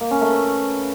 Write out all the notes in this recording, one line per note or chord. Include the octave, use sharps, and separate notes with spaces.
A#3
C#4
A3
B4